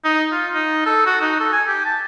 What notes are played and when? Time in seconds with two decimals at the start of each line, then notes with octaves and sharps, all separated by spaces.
0.04 D#4
0.32 F4
0.53 D#4
0.86 A4
1.06 F#4
1.21 D#4
1.40 A4
1.53 G#5
1.67 G4
1.85 A5